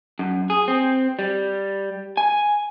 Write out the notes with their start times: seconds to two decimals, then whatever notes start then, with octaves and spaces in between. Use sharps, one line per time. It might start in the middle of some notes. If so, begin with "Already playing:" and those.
0.19 F#2
0.50 G#4
0.68 C4
1.19 G3
2.17 G#5